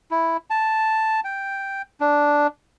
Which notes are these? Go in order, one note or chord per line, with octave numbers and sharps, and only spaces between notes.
E4
A5
G5
D4